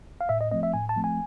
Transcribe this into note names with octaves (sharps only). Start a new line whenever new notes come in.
F5
A2 E5
D#5
F3 A3 C4 D#5
E5
A2 G#5
A5
F3 A3 C4
G#5